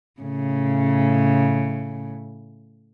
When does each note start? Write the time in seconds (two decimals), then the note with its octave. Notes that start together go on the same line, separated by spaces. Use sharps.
0.21 A2 C#3